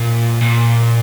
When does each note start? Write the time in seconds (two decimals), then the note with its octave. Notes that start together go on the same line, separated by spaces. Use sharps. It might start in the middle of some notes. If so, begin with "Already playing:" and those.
Already playing: A#2
0.42 A#2